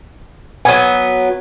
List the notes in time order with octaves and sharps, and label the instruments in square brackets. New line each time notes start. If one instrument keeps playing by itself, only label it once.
[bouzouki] F#3 B3 [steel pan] G#5